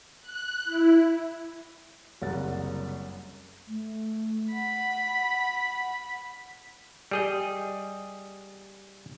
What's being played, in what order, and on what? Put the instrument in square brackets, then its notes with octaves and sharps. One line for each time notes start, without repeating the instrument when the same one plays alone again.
[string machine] F#6
E4
[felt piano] F#1 C2 F#2 A#4 F#5 A6
[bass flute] A3
[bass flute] F#5 [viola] B5
[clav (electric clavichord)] G3 G#4 D#5